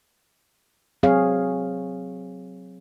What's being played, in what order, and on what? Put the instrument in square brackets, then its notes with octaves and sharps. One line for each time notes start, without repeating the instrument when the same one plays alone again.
[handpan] F#3 C4 G#4 C#5 F5